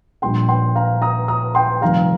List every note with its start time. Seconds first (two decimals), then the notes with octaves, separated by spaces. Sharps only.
0.22 A#1 A#2 G3 G5 C6
0.49 G5 C6
0.75 F5 A#5
1.02 A#5 D#6
1.28 A#5 D#6
1.55 G5 C6
1.81 F1 F2 D#3 G3 F5 A#5